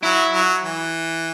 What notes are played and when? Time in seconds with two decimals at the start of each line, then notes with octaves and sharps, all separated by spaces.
0.03 F#3 E4
0.34 F#3
0.64 E3